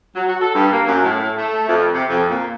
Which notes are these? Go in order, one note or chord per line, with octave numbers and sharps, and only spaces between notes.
F#3
F#4
A4
G2
A#3
F#2
A2
A3
F2
C3
F2
A#2